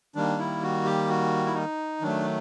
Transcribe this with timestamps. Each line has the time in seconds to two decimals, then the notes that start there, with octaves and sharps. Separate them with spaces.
0.15 D#3 G3 A#3 D4
0.39 E4
0.63 F#4
0.85 G4
1.09 F#4
1.46 E4
1.55 D#4
2.01 D#3 F#3 A3 D4